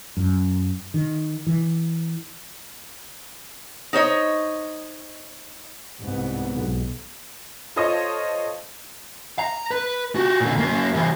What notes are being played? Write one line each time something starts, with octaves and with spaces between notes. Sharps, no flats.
F#2
D#3
E3
D#4 C5 C#5 D#5
C2 G#2 B3
B1
F4 A4 C5 C#5 D#5
A#5
B4
F#4 G4
A#2 D3
F#3 A#3
E3 G3